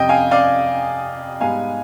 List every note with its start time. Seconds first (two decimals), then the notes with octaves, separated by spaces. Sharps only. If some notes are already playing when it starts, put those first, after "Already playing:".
Already playing: F2 C3 G3 D#5 G5
0.09 F5 G#5
0.31 D5 F5
1.41 G#2 G3 B3 F5 G#5